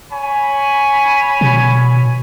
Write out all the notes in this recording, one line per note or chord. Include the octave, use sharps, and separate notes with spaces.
C#5 G#5 B5
B2